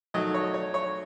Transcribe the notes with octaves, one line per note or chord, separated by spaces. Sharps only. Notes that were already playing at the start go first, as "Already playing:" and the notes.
D#3 F#3 A3 D#5
C#5
C#5
C#5